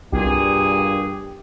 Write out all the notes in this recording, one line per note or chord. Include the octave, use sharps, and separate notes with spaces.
C2 G2 A#2 G4 G#4